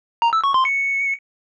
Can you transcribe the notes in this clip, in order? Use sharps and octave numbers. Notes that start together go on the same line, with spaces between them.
A#5
E6
C#6
C6
C#7